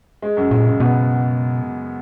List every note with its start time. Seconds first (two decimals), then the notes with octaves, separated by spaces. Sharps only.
0.22 G#3
0.37 F#2
0.51 A#2 G#3
0.65 C#3
0.80 B2 B3